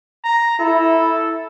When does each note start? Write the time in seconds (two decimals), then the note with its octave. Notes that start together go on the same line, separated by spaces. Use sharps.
0.24 A#5
0.60 E4 A4